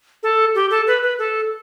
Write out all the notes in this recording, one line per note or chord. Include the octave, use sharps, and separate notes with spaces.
A4
G4
A4
B4
B4
A4